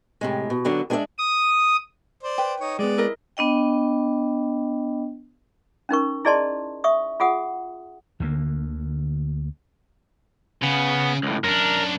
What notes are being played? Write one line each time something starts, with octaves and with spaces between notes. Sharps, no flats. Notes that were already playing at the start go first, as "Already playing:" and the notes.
A2 C3 G#3
B2
D3 F#3 B3
G#3 D4 G4 C5 D5 E5
D#6
C5 D5
B4 G5
D#4 C#5
G#3 B3 D5
E4 A#4 D#5
B3 D4 D#5 G5
C#4 D#4 A#4 C#6
E4 G#4 D5 D#5 A5 C6
E5 C#6 D#6
F4 G#4 F#5 D#6
D2 D3 E3 A#3
C#3 B3
C#2 A2
F#2 D4 A#4